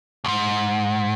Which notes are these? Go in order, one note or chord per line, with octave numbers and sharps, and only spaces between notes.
C#2 G#2